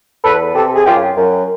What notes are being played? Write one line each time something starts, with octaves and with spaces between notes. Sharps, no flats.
E2 A4 B4
C3 G4 A4
G#4
F#2 F4 G4
F#2